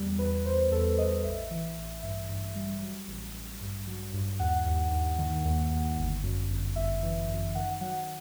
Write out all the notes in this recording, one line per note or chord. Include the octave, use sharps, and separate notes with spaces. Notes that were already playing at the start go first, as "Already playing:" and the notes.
Already playing: E2 G3
E2 B4
E2 C5
E2 A4
E2 D#5
A1 E5
E3
A1
G2 E5
G2
G3
F#3
A1
A1
G2
F#3
G2
D#2 F#5
D#2
D#2
D#3
D#2
D#2
G1
F#2
G1
G1 E5
E3
F#2
D#3 F#5
F#3 F#5